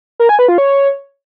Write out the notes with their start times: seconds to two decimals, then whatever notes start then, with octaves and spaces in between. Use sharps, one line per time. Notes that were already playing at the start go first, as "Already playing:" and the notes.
0.20 A#4
0.29 G#5
0.39 B4
0.48 F4
0.58 C#5